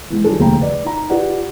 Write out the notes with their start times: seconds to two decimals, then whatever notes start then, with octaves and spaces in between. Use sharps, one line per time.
0.10 E3 G#3
0.24 D#3 F#3 G3 D4 G#4 A4
0.39 F1 D#2 C#3 G3 G5 A#5
0.61 B4 D5
0.84 D#4 A#5
1.10 F4 G4 B4 D5 F#5